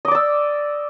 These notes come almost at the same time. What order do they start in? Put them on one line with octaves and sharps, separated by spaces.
D#5 D6 D5 E6